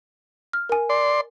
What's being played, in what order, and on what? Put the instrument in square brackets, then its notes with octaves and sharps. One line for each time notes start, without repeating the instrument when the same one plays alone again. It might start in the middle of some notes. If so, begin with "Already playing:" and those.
[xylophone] F6
A#4 G#5
[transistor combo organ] D5 C6